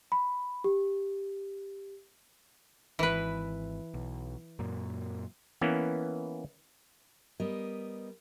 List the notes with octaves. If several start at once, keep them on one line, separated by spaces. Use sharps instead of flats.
B5
G4
G#1 E3 B4
B1
F#2 A#2
E3 A#3 B3 C#4
G3 B3 A#4 D#5